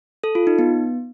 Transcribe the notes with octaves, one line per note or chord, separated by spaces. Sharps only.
A4
F4
D#4
B3